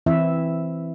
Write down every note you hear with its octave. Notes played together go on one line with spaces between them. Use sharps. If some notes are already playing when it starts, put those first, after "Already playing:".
E3 C4 E4 E5